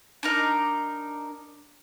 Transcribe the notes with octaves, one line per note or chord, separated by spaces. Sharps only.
D4 D#4 A#4